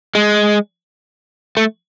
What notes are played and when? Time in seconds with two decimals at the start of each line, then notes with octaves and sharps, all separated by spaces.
0.15 G#3
1.57 A3